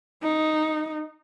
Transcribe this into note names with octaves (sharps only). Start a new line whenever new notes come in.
D#4